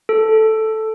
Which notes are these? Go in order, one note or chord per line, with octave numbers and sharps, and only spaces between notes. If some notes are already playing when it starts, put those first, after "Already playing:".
A4